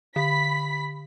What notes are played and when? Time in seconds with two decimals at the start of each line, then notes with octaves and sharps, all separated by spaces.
0.16 D3 B5 B6